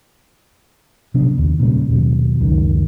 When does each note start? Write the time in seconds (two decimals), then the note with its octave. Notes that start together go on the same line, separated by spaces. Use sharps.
1.14 C3 F#3 B3 D4
1.38 D#2
1.59 A#2 C#3 E3 G3
1.89 D#2 B2 F#3
2.40 C#2 F#2 D#3